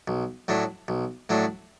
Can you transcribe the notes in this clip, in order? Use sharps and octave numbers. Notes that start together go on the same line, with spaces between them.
B1
A2 F#3 A3 D4
B1
A2 F#3 A3 D4